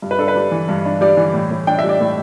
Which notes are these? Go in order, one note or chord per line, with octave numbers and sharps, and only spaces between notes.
G2
B4
D4 A4
B4
G3
E3
G2
D4
G3 D5
E3
A2
A2
D4 G5
E5
G3
D5
A2